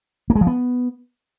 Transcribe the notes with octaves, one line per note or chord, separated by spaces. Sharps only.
A#3
G#3
F3
B3